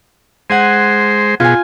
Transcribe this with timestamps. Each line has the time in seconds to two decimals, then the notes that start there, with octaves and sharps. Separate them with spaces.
0.50 G#3 C5 F#5 G#6 D#7
1.40 B2 F4 G#4 G#5